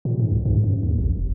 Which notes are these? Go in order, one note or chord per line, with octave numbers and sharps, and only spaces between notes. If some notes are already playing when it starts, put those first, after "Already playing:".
A#2
G#2
C2
G#2
F#2
D#2
A1
E1